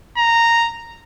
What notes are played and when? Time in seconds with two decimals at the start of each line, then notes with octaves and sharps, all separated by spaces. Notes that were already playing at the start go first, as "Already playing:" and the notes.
0.18 A#5